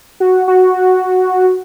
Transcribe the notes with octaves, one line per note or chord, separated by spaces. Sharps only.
F#4
F#4